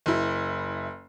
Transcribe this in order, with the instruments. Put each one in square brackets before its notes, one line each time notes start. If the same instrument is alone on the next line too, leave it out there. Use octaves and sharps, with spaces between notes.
[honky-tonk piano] F#1 E4